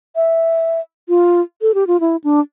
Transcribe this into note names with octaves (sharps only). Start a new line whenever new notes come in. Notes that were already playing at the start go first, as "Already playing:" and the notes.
E5
F4
A4
G4
F4
E4
D4